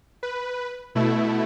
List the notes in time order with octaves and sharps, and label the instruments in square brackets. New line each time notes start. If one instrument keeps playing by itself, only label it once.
[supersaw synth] B4
B2 A3 E4